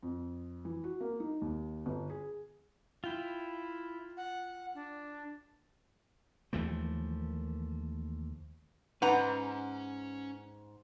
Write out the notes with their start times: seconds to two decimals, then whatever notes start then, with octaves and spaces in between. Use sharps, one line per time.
0.03 F2
0.65 E3
0.84 F#4
1.01 A#3
1.20 D#4
1.41 D#2
1.86 G1
2.10 G#4
3.04 E4 F4 G5
4.17 F#5
4.75 D4
6.53 D#2 E3 F3 A3
9.02 G#2 C#4 B4 F#5 A#5 C6